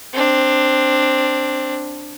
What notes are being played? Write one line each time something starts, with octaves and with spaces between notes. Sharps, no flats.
C4 D4